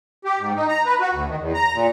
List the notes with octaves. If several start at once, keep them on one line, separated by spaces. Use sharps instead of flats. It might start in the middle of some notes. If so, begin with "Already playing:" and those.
G4
G#2
D#4
A#5
B4
F#4
D2
D#3
E2
A#5
A#2